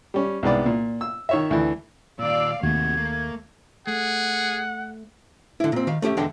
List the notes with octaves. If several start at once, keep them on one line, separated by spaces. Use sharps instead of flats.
G3 C#4
C2 G#2 B3 D5
A#2
E6
D#3 C#5 E5
D2 E3
D#2 A#2 D5 F5 E6
D#2 C3 A3 F#4 G#6
A#3
A3 G#4 F#5
D3 E4
A#2 C4
D#3 F5
A3 C#4 G4 E5
E2 D3 G#3 D4 F#5 G5